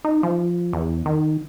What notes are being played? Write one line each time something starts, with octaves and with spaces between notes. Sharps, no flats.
D#4
F3
E2
D#3